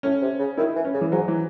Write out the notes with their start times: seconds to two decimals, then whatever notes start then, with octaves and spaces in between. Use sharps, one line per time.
0.03 A2 C#4
0.21 C3
0.39 C#3
0.57 D#3 E4
0.76 E3
0.85 C#4
0.94 C#3
1.01 E3
1.12 G#2 F#3
1.28 E3